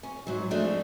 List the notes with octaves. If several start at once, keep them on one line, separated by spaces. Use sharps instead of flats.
C#4
G#2 F#3
F3 G#3 A3 C4 D4 D#4